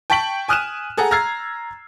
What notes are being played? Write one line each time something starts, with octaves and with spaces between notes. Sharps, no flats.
G5 A5 C#6 B6 D7 F#7
G#5 D#6 F6 F#6 D#7 E7
G#4 A4 F#5 A#5
A#5 E6 F6 G#6 A6 C7